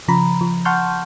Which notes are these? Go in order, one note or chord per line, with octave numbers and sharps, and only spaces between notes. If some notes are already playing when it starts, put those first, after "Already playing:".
C#3 F3 A#5 B5
F3
F#5 A5 C6 C#6 F6 G6